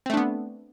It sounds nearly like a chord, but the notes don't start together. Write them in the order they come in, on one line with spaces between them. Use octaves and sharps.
C4 A3 D4 B3